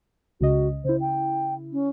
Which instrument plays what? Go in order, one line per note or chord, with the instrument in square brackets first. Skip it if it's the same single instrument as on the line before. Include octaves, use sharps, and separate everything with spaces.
[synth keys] C#2 C#3 D#5 [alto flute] F#4
[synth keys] C#3 E4 [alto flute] C5
[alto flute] G5
C#4